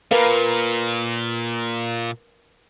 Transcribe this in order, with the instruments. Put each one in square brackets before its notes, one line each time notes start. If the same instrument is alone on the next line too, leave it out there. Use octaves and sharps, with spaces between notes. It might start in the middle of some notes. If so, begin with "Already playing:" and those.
[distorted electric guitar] A#2 [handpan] A#4 B4 F5